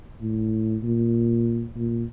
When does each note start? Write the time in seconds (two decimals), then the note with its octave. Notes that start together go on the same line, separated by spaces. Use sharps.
0.21 A2
0.83 A#2
1.76 A#2